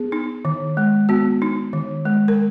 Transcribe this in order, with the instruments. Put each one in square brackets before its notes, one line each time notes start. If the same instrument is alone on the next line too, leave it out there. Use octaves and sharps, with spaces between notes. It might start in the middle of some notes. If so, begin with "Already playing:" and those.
Already playing: [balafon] B3 G#4
D#4
D#3
G#3
B3 F#4
D#4
D#3
G#3
A#4